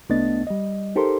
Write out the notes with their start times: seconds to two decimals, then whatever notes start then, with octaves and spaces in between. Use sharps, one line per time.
0.09 C2 A3 B3 D4 D#5 A6
0.47 G3 D#5
0.96 D#4 G4 A4 A#4 C5 C6